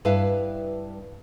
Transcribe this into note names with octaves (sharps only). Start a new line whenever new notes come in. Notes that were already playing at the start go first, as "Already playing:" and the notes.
G2 E4 B4 F5